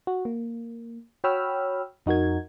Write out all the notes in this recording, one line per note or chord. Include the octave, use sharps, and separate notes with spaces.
F#4
A#3
F#4 C#5 G5 B5 E6 F6
F2 D#4 F#4 A#4 G#6